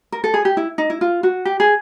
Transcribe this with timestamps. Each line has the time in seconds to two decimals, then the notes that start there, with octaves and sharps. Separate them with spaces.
0.12 A#4
0.24 A4
0.34 G#4
0.45 G4
0.57 E4
0.78 D#4
0.90 E4
1.01 F4
1.23 F#4
1.45 G4
1.60 G#4